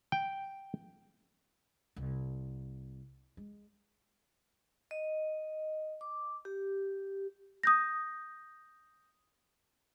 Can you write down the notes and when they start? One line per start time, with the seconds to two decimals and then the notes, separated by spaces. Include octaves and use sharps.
0.12 G5
1.96 C2
3.37 G#3
4.91 D#5
6.01 D6
6.45 G4
7.63 D#6 G6 A#6